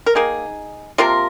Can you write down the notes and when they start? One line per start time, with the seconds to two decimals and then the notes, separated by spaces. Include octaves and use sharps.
0.06 A#4
0.15 D#3 A#3 D#4 G#4
0.98 C3 F3 A#3 F4 A#4